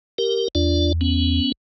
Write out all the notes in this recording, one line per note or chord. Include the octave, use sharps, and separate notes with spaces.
G4 A#4
E2 D4 F4 D5
B3 C#4